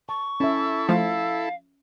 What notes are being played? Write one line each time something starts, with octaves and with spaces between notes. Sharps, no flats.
A5 C#6
C#4 E4 A4 E5
F3 A3 F5